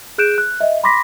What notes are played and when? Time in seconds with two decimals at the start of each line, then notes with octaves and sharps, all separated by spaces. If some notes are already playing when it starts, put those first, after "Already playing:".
0.18 G#4 F#6 G6 D7 E7
0.38 F#6
0.61 D#5 E5
0.83 B5 C6 D6 A#6 B6